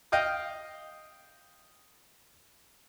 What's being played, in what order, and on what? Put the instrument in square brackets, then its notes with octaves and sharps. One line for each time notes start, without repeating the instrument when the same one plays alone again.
[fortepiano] D#5 F5 G5 D#6